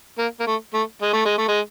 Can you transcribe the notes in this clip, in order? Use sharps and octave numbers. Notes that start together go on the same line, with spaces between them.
A#3
A#3
A3
A3
G#3
A3
G#3
A3
G#3